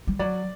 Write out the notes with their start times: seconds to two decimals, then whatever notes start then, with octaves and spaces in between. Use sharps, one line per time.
0.07 G3
0.19 F#3 D5